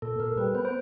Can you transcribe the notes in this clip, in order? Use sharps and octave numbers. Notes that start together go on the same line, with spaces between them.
A#2 A4
A#2 A#4
G3 B4
B3 C5
C5